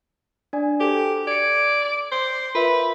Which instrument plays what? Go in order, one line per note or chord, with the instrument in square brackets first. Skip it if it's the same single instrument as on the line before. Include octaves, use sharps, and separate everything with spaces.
[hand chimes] D4 D5 G#5
[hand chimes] F#4 A4 C5 [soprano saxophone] G4
[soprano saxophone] D5 [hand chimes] G#6 C#7
[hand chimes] D6
[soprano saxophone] C5
[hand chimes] F4 A#4 E5 [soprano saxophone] B4